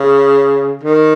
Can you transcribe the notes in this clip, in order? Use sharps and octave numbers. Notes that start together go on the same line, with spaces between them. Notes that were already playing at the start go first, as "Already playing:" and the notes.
Already playing: C#3
D#3